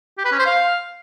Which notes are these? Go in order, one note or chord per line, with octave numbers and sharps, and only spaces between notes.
G4
B4
C#4
C5
F5